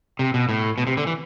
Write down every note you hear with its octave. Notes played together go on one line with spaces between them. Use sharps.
C3
B2
A2
B2
C3
D3
E3